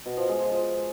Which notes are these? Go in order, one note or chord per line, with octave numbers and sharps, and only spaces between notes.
B2
F3
G#3
F3
F3